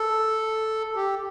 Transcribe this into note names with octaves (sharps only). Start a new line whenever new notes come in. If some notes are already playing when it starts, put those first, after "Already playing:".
Already playing: A4
G4